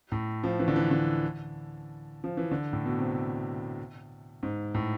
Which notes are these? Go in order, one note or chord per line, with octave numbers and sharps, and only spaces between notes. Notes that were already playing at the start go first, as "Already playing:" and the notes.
A2
F3
E3
D3
E3
D3
F3
E3
D3
A2
B2
C3
G#2
A2